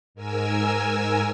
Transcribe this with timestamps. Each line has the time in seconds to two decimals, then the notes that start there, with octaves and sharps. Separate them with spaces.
0.15 G#2 A#4 G#5 E6